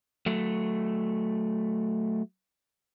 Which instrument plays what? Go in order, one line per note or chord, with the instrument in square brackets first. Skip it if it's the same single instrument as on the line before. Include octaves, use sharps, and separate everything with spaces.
[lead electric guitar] F#3 A3